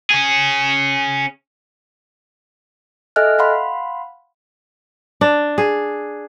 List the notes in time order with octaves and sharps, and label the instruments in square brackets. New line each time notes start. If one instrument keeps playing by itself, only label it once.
[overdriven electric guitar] C#4 G#4
[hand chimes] A4 D#5 E5 G#5 F6 F#6
F5 F#5 B5 C6
[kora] D4
G#4